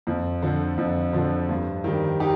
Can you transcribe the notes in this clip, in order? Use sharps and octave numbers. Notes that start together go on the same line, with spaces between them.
F2
D3 F3
F2
D3 F3
G2
D#3 G3
D#4 G4